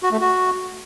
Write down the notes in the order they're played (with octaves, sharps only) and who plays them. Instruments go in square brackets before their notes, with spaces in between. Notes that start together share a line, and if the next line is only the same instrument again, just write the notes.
[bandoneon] F#4
A3
F#4